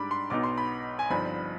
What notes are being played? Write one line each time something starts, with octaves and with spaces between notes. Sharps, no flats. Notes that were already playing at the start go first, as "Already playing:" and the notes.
Already playing: G#2 G3 D4 B5 D6
C6
B1 B2 B3 D#4 D6
C6
B5
G#5
G1 G2 F3 C4 D#4 B5